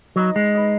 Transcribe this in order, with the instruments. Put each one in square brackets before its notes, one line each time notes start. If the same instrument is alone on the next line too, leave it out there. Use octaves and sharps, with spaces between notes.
[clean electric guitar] F#3 [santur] D#4 B4 D#5
[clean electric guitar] G#3
[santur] D#4 B4 D#5